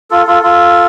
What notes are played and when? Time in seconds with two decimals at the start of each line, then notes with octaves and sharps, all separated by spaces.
0.11 F4 A4
0.27 F4 A4
0.43 F4 A4